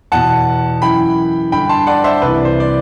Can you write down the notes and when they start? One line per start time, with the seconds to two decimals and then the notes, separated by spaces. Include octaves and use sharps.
0.12 E2 B2 F#5 A5
0.82 F#2 E3 G5 B5
1.52 G2 D3 G5 B5
1.69 A5 C6
1.87 D5 F#5
2.04 C5 E5
2.22 C2 C3 E3 B4 D5
2.45 C5
2.60 D5